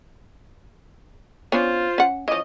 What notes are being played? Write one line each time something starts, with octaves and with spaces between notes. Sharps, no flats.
B3 C#4 D4 F4 C5
C#4 F#5
E3 F3 C#4 D#5